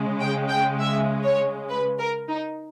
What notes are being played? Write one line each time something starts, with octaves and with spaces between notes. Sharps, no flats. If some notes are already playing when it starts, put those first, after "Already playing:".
Already playing: C#3 G#3
G5
G5
E5
C#5
B4
A#4
D#4